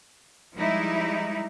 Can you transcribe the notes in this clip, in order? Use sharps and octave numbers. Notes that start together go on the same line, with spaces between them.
F3 G3 G#3 D#4 E4